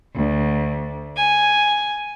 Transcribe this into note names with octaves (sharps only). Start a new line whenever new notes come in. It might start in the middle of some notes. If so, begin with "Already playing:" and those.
D2
G#5